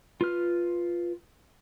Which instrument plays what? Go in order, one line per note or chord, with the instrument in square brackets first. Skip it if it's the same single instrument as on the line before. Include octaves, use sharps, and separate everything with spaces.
[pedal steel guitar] F4 B4 F6